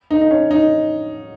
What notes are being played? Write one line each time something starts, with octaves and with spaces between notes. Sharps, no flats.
D#4
D#4
C#4
D#4